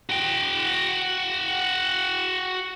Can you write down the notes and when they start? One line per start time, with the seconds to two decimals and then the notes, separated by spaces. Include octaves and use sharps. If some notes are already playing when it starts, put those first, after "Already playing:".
0.10 F#4 G5